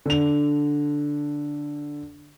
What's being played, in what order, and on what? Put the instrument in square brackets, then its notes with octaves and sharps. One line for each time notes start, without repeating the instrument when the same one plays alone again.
[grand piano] D3 F7